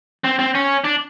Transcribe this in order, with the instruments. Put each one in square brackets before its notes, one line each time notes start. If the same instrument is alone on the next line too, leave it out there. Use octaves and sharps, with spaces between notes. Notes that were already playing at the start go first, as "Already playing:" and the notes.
[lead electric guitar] C4
C4
C#4
D4